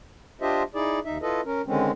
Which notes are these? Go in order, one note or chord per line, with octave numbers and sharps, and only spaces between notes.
D4 F4 G4 C5 D#5 E5
D#4 E4 G#4 D5
D#2 D#4 E5
E4 F4 A4 B4 D#5
C#4 A#4
D3 D#3 G#3 C4 C#4